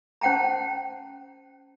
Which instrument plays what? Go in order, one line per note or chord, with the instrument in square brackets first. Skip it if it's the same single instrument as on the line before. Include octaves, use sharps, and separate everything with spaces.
[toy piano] C#4 C5 F#5 G5 A5 A#5